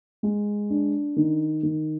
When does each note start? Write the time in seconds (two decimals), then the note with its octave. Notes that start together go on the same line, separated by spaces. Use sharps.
0.23 G#3
0.70 D4
1.17 D#3
1.63 D#3